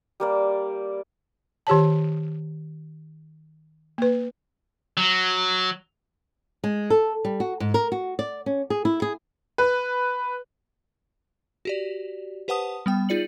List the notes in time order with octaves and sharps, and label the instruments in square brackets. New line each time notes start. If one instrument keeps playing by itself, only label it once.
[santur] G3 A#3 D5
[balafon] D#3 G4 C#5 A5
A#3 B4
[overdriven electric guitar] F#3
[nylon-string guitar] G#3
A4
G3
F#4
G#2
A#4
F#4
D5
C#4
G#4
E4
G#4
[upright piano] B4
[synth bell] F#4 G4 D5
G4 B4 C5 F#5 A5 D#6
G3 B3 G5
D#4 F4 G#4 D5 C#7 F#7